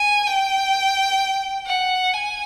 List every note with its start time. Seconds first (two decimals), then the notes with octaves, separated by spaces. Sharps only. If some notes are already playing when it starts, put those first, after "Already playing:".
Already playing: G#5
0.27 G5
1.66 F#5
2.14 G#5